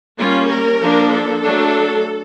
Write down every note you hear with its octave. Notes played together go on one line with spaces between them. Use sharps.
G3 A#3 C#4 F4
A#4
F3 A#3 D4
A4
F#3 A3 D4